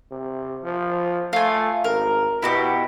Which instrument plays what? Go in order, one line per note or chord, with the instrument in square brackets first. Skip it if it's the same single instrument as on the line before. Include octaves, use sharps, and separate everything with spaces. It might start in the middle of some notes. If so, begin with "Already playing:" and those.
[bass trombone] C3
F3
[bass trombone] A3 [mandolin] F4 G#5
[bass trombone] G#1 [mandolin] A#4
[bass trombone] B2 [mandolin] E4 F#4 G4